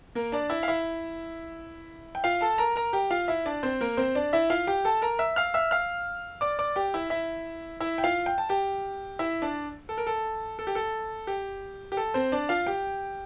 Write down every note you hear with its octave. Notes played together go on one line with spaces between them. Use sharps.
A#3 A#4
D4 D5
E4 E5
F5
E4 E5
G5
F4 F5
A4 A5
A#4 A#5
A#4 A#5
G4 G5
F4 F5
E4 E5
D4 D5
C4 C5
A#3 A#4
C4 C5
D4 D5
E4 E5
F4 F5
G4 G5
A4 A5
A#4 A#5
E5 E6
F5 F6
E5 E6
F5 F6
D5 D6
D5 D6
G4 G5
E4 E5
E4 E5
E4 E5
G5
F4 F5
G5
A5
G4 G5
E4 E5
D4 D5
A4
A#4
A4
A4
G4
A4
G4
G4
A4
C4 C5
D4 D5
F4 F5
G4 G5